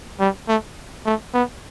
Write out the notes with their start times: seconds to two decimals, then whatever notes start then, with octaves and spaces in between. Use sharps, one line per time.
0.20 G3
0.48 A3
1.06 A3
1.34 B3